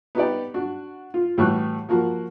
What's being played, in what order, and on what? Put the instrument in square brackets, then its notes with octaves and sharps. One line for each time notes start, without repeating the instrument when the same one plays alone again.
[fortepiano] B3 D#4 G4 D5
D4 F#4
F4
A2 E3 G3 F#4 C#6 F#6
F3 A#3 F#4